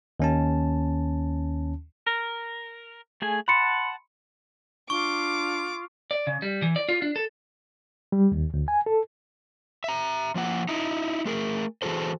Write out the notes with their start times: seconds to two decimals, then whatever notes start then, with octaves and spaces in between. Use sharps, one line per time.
0.20 D#2 C#4 A5
2.06 A#4
3.22 A3 G#4 G#5
3.48 F#5 A5 B5 C6 C#7
4.90 D4 F4 C#6 D6
6.11 D5
6.27 C#3
6.42 G3
6.62 E3
6.76 D5
6.89 F4
7.02 D4
7.16 A4
8.12 G3
8.32 D#2
8.54 D2
8.68 G#5
8.86 A4
9.84 E5 A#5
10.35 F3 A#3 F#5
10.69 D#4 E4
11.26 A3 G#4 A#4
11.82 E3 F#4 G#4 A4 C5